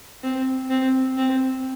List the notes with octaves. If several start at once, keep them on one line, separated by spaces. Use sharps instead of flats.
C4
C4
C4